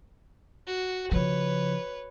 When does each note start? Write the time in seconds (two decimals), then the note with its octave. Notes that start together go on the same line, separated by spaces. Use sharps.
0.67 F#4
1.12 C#3 F3 B4 C#5